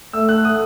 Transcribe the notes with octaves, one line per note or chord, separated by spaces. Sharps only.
A3 E6
F#6
D#6